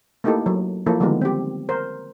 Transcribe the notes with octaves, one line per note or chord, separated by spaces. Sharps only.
A3 A#3 D#4 E4 G4 A4
F#3
F3 A#3 E4 A4
D3 D#3 F3 G3 G#3 B3
C4 G4
A#4 C5